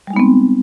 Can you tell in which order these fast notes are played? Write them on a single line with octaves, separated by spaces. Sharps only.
G3 G#3 D#4 B3 C4